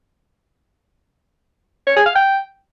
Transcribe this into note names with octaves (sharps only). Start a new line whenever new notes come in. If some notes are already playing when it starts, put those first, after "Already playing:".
C#5
G#4
F5
G5